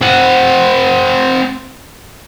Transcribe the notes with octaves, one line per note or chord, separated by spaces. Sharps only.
C4 F#5